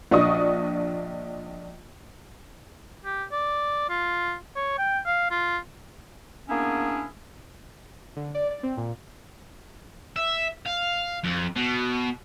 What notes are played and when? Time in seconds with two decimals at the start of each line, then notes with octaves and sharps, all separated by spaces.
0.11 A#1 D4 D#5 C#6 D#6
3.05 G4
3.32 D5
3.90 F4
4.56 C#5
4.78 G5
5.06 F5
5.31 F4
6.49 A#3 B3 C#4 D4 E4 G#4
8.16 D3
8.35 D5
8.51 D5
8.63 C4
8.77 A#2
10.16 E5
10.66 F5
11.24 F2
11.56 B2